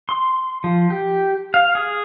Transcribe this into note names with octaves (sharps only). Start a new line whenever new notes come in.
C6
F3
G4
F5
G#4